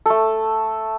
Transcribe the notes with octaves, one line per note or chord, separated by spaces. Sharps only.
A3 A4